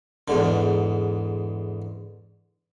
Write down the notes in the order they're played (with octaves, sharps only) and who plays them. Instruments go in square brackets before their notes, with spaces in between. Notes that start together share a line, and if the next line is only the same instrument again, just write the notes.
[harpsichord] E2 G#2 D3